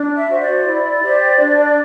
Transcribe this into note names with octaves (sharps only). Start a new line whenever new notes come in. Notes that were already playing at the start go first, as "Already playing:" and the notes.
Already playing: D4
E5
F#4 C5
D5
E4
G4 C5
D4